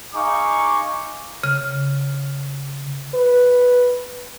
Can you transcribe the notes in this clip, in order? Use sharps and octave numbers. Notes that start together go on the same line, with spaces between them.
D#4 G#4 F5 C#6 D6
C#3 F6
B4